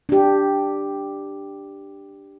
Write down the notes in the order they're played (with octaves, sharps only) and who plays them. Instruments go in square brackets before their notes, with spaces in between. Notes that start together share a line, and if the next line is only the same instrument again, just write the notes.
[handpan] D4 G4